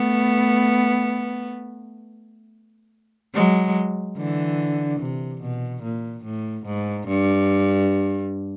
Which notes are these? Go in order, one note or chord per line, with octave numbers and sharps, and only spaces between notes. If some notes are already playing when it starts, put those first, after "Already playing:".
Already playing: A3 B3
F#3 G#3
D3 E3
C3
B2
A#2
A2
G#2
G2